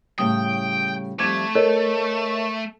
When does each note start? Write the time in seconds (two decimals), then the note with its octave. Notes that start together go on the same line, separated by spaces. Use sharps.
0.19 A2 C#3 G3 G5 D#6
1.19 F2 G3 A3 D6 G#6
1.55 A4 A#4 C#5 D#5